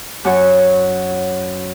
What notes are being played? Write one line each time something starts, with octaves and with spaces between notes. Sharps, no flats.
F#2 F#4 C#5